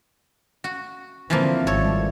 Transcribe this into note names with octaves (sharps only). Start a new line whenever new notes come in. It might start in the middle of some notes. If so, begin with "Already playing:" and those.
F#4
D3 E3 F3 A#3 C4
G#1 G3 A4 C#5